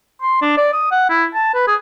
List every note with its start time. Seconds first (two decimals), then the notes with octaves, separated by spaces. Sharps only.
0.22 C6
0.42 D4
0.58 D5
0.73 D#6
0.91 F#5
1.09 E4
1.35 A5
1.55 B4
1.68 G#4